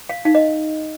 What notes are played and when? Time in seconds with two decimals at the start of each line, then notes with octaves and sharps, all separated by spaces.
0.09 F5
0.25 D#4 F5
0.35 D#5